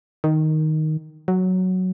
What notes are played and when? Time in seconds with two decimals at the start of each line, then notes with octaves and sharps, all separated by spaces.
0.24 D#3
1.28 F#3